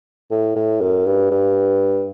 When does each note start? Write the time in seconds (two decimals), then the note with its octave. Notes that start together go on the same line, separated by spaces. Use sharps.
0.31 A2
0.56 A2
0.81 F#2
1.06 G2
1.31 G2